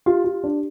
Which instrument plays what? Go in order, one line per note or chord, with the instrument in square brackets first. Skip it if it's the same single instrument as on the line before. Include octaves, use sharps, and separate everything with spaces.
[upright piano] F4 [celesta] G4
[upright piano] F4
D4